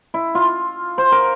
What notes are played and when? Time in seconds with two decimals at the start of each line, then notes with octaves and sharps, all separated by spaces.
0.14 E4
0.35 F4
0.98 C5
1.12 A#4